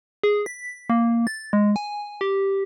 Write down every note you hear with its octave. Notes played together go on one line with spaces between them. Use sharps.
G#4
B6
A#3
A6
G#3
G#5
G4